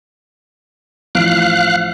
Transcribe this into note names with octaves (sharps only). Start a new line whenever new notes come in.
A1 F3 F5 F#6 D7